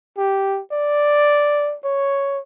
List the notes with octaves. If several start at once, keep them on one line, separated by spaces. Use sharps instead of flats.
G4
D5
C#5